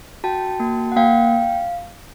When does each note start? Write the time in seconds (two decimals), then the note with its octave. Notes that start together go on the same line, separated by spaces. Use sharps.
0.24 F#4 G5 A5
0.60 A#3
0.92 F#5
0.96 A#3 F5 G5